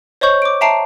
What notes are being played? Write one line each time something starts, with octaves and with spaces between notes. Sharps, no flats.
C5 C#5 D#5 C#6 G6 F#7
D6 D7
E5 G5 A5 A#5 C7 D7